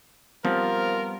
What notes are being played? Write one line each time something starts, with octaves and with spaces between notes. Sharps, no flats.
F3 G3 B3 C4 F4 A#4